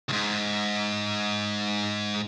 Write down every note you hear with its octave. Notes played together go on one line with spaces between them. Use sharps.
D2 G#2